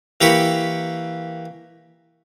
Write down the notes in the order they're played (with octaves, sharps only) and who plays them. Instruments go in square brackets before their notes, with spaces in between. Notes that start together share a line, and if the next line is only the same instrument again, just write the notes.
[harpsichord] E3 A#3 G4 B5 C#6 D6